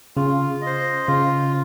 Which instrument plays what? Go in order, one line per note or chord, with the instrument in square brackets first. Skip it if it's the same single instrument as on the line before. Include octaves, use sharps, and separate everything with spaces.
[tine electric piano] C#3 [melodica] F4
[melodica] D#5
C5
[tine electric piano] C#3 [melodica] F4